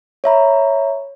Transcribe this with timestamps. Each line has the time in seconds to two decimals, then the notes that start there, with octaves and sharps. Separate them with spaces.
0.24 C#5 E5 A#5 B5